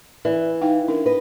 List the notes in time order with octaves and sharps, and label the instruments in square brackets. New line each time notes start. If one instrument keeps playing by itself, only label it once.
[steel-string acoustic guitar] E3 [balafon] D5
[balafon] D#4 F5 G5
C#4 D4 A#4
[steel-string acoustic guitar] B4 D#5